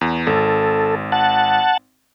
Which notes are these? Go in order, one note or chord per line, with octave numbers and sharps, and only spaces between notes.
E2
G#1 A4
F#5 A5